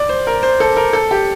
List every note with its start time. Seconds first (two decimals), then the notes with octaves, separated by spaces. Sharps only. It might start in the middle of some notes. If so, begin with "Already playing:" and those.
Already playing: D5
0.09 C5
0.27 A#4
0.43 C5
0.60 A4
0.77 A#4
0.93 A4
1.11 G4